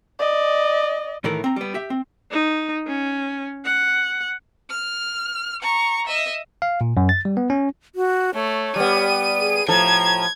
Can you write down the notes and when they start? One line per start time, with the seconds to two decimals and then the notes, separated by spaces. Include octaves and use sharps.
0.19 D5 D#5
1.24 A2 D#3 E3 A3 A#4
1.44 C4 A#5
1.56 G3 B3
1.74 G4 E5
1.90 C4
2.31 D#4
2.87 C#4
3.64 F#5
4.70 F6
5.62 A#5 C#6
6.07 D#5 E5
6.62 F5
6.81 A#2
6.97 F#2
7.09 A6
7.25 G3
7.37 B3
7.50 C#4
7.95 F#4
8.34 A3 C#5
8.76 G3 B3 D#7
9.39 G#4
9.68 A2 F3 A4 A#5 G#6